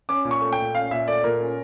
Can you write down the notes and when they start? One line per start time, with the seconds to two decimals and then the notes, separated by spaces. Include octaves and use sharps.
0.09 C#4 D6
0.25 A#2
0.31 C#6
0.41 A3
0.53 G5
0.58 A#2
0.75 C#4 F5
0.91 A#2 E5
1.08 A3 D5
1.24 A#2 A#4
1.41 C#4